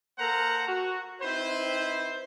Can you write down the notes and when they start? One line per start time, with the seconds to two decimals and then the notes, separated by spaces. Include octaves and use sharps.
0.19 A#3 A4 A#4 C5 F#5 A#5
0.68 F#4
1.22 C4 D#4 E4 B4 C5